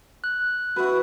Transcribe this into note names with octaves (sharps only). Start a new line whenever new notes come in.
F#6
E4 F#4 B4